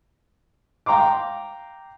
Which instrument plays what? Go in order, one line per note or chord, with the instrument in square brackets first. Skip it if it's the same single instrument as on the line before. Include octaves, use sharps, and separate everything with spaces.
[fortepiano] F5 G5 A#5 C6 D6